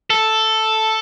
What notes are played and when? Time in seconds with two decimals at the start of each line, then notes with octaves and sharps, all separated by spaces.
0.10 A4